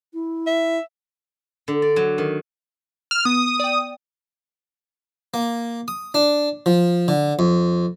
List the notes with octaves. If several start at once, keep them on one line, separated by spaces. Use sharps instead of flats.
E4
E5
D3
D5
F#3
D#3
F6 E7
B3 D#6
D5 G5
A#3
D#6
D4
F3
D3
F2